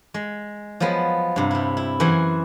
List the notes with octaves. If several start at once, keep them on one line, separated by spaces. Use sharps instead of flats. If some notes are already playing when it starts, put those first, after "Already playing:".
G#3
F3 F#3 G#3 B3
G2 C3
G3 E4
E4
F#2 E3 G#4 C5 F#5